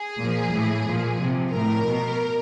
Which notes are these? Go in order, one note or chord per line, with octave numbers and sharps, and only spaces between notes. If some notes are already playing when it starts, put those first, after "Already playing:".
Already playing: G#4
A#2 F3
A2 E3
A#2 F3
C3 F3
A2 F3 A#4
B2